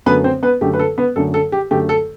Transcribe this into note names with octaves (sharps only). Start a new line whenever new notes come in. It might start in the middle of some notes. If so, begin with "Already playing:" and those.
F#2 D3 A3 B3 B4
C4 C5
B3 B4
F#2 D3 A3 G4
B4
A4
B3 B4
F#2 D3 A3 A4
A4
G4
F#2 D3 A3 G4
A4